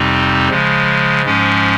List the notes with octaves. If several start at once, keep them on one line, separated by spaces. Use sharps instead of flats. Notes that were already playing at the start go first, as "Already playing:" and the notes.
Already playing: F2 C3 G3 C4 D#4
C#3 F3 G#3
G#2 F3 G#3 C#4